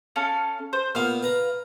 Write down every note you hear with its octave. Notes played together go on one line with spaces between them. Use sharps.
C#4 A4 F5
C5
A#2 B3 F5 F6
B4 A#5